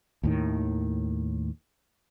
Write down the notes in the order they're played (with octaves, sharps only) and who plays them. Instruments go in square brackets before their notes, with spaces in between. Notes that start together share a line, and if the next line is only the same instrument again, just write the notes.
[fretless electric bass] D#2 A2 D#3